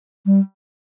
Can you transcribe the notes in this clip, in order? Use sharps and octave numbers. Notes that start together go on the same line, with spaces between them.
G3